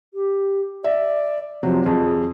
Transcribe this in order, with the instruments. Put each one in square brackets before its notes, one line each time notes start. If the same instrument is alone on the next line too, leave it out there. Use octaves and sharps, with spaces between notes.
[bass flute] G4
[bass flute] D5 [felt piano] E5
[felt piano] C3 F#3 [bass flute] F3
[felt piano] F2 [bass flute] G#4